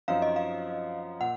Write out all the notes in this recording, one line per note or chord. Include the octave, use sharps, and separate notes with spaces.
F#2 F3 C4 D#4 F5
D#5
F5
A#2 F#5